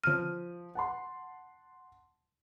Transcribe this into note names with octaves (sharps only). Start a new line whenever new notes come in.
F3 F6 D#7
F#5 A5 C6